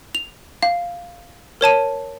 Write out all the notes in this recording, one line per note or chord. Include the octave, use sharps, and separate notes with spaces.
F7
F5
A#4 C#5 A5 D#7